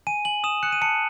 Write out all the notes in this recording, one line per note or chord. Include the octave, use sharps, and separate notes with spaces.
G#5 D#7
G#5 F#7
D#6 E7
F#6 C#7
D#7
A5 C#7